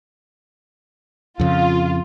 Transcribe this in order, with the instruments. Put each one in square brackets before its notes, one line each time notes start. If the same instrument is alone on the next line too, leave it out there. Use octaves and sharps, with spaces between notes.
[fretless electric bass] F2 C#3 [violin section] F4